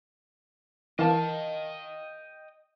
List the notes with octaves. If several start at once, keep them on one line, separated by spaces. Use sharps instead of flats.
E3 A#4 D#5 F5 G5 A5